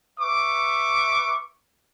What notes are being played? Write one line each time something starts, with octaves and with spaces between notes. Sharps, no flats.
B4 E5 C#6 D6